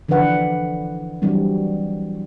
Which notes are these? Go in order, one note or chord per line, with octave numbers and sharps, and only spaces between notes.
D3 E3 F3 D4 B4 F#5
E3 F#3 G3 C4 D4